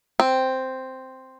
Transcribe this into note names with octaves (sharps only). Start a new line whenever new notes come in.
C4